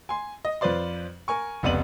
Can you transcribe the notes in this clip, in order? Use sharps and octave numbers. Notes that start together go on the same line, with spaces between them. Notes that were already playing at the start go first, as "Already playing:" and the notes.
G#5 C6
D#5
F2 F4 B4 C5 D5 C6
A#4 G#5 C#6
F1 C#2 B3 D5 D#7 F#7